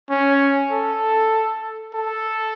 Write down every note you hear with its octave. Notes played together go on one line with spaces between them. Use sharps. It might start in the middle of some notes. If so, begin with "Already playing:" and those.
C#4
A4
A4